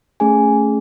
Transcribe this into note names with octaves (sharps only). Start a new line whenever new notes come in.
A3 C#4 G#4 G#5